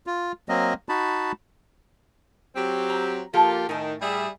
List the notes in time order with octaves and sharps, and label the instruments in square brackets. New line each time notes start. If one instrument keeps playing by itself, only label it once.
[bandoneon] F4
F#3 A#3 C4 D#5
D#4 F#4 A5 B5
[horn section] F#3 C4 G4
[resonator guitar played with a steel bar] A#5
[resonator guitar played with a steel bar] F3 A4 [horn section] A#3 F4 G4
[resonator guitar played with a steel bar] A2 G#5 [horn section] D#3
[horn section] G3 G#4 E5